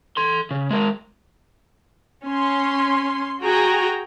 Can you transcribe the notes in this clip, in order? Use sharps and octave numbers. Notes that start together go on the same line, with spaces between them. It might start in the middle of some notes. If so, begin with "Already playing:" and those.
A4 C6
C#3
G#3 A#4
C#4 C6
F#4 G#4 G5 G#5 A#5